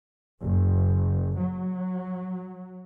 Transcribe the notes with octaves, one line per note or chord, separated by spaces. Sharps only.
F#1
F#3